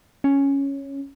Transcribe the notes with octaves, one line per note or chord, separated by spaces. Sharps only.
C#4